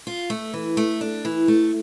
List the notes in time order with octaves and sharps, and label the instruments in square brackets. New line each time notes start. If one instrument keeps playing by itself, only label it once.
[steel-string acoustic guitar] F4
A3
E3
A3
D4
E3
A3